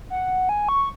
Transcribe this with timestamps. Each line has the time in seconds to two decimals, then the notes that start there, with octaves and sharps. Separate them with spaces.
0.10 F#5
0.49 G#5
0.69 C#6